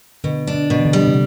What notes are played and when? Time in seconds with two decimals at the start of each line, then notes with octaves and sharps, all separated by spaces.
0.24 B2 D3
0.47 D4
0.55 D3
0.70 B2
0.80 E3
0.85 D3
0.93 G3
1.07 C3